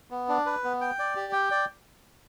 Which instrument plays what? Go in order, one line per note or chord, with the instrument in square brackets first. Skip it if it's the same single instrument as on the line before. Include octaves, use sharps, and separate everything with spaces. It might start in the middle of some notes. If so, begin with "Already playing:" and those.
[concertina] B3
D4
B4
B3
G5
D5
G4
G5
D5